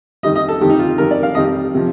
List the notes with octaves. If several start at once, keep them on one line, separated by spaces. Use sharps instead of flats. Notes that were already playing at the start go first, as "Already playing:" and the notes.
F2 D#3 G3 D#5
D#5
A4
F2 D#3 G3 G4
D#4
F4
F2 D#3 G3 A#4
D5
F5
F2 D#3 G3 D#5
C3 F3